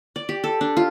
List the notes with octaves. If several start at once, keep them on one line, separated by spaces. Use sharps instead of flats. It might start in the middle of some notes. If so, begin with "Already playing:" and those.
D5
G4
A4
D4
F4